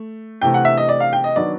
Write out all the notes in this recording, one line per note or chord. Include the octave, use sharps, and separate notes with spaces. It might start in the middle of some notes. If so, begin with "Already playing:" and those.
Already playing: A3
C3 E3 A3 G5
F#5
E5
D#5
D5
F5
G5
D#5
D#3 F#3 B3 D4 D5